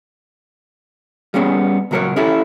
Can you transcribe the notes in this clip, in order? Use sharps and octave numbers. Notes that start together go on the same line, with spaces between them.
G3 A#3 B3 C#4 G#4
C#2 A#2 F#3 A4 A#4 C#5
C#4 E4 G4 A4